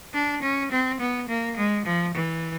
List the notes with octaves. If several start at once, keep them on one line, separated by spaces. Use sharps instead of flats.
D4
C#4
C4
B3
A#3
G#3
F3
E3